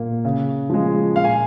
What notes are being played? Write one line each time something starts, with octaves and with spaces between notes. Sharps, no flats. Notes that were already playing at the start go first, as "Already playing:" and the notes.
Already playing: A#2 A#3
C#3
F3 G#3
A#2 F5
G#5